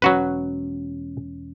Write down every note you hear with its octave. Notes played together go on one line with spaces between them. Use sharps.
E1 F#3 C#4 F#4 B4